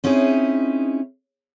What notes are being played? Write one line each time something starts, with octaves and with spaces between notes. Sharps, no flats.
C4 C#4 D#4 E4 G#4